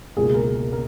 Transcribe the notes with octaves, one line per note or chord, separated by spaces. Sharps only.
C#2 B2 A#3 G#4
A#4
A#3 A#4